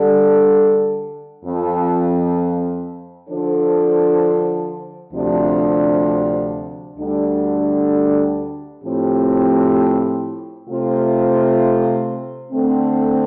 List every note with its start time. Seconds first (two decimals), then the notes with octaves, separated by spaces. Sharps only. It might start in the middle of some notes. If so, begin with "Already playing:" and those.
Already playing: D3 G3 D4 A4
1.43 F2 F3 C4
3.28 D3 F3 D4 A4 C5
5.12 D2 C3 F3 D4 G4
6.97 D2 D3 G3 D4
8.82 A2 F3 C4 G4
10.67 C3 A3 F4 C5
12.51 D3 A3 C4